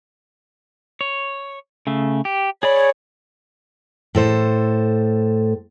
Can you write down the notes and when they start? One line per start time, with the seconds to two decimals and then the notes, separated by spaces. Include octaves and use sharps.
1.01 C#5
1.87 C#3 A3
2.25 G4
2.63 G#4 C#5 D5 B5
4.15 A2 A4 C5